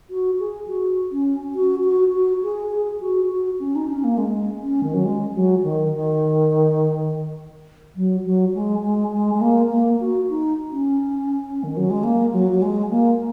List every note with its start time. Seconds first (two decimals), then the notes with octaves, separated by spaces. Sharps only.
0.10 F#4
0.39 G#4
0.68 F#4
1.12 C#4
1.55 F#4
1.84 F#4
2.13 F#4
2.43 G#4
2.72 G#4
3.00 F#4
3.30 F#4
3.60 C#4
3.76 D#4
3.89 C#4
4.04 A#3
4.17 G#3
4.62 C#4
4.83 D#3
4.94 F#3
5.05 G#3
5.34 F#3
5.63 D#3
5.92 D#3
7.96 F#3
8.25 F#3
8.55 G#3
8.84 G#3
9.12 G#3
9.35 G#3
9.41 A#3
9.71 A#3
10.00 F#4
10.29 D#4
10.72 C#4
11.64 D#3
11.77 F#3
11.90 G#3
12.03 A#3
12.33 F#3
12.51 F#3
12.62 G#3
12.90 A#3